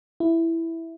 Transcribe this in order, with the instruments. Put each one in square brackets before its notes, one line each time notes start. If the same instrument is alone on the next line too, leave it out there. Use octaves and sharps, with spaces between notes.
[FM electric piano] E4